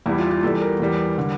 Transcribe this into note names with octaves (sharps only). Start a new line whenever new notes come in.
E2 E3 G3 E4
F4
F4
E2 E3 G3 A4
A#4
E2 E3 G3
D3 G3